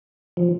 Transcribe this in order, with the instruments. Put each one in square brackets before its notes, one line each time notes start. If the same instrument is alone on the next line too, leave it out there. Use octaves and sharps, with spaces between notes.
[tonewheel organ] F3